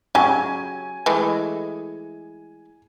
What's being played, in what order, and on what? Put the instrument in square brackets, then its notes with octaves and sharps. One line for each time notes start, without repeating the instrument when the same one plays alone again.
[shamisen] C#3 F#3 G4 [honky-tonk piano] G#5
[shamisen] E3 G#3 A3